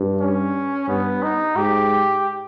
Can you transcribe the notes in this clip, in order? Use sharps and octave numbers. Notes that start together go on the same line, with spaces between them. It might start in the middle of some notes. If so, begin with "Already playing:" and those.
Already playing: G2
C#4
G2 B3
D#4
G#2 G4